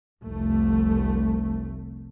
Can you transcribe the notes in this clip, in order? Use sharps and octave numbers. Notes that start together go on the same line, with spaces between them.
F1 C2 A3